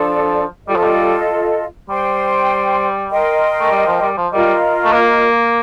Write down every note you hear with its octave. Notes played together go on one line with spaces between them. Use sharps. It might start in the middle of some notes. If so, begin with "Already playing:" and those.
Already playing: F3 D4 A4 D5
G3 F4 A4 D#5
F3
G3
G3 C5 G5 C6
A#4 D#5 G5 C6
A3
G3
F3
G3
F3
G3 F4 A#4 D#5
A3
A#3